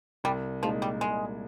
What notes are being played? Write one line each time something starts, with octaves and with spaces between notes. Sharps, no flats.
C2 G3
A#2 F3 G#3 D#4
G3
C2 G#3